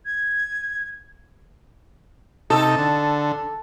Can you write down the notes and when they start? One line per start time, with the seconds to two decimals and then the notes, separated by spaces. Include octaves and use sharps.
0.05 G#6
2.50 C3 D#4 A4
2.78 D3